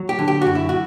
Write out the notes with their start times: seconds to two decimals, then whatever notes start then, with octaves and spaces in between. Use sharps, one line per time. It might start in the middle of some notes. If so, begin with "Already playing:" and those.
Already playing: F#3
0.09 G4
0.19 D3
0.28 G4
0.42 F#2 F#4
0.55 E4
0.69 F#4